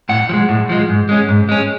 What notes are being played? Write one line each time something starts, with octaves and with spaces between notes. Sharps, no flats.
A2 F#5
F3
G#3
A2
F3 G#3
G#2
G#3 C#4
G#2
G#3 C#4